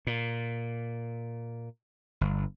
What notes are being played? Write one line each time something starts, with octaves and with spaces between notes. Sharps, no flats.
A#2
G1